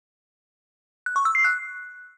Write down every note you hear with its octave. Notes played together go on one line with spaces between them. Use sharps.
F#6
C#6
E6
C7
F#6